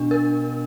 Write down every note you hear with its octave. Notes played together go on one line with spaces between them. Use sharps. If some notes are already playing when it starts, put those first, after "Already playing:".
Already playing: B2 D4
A#4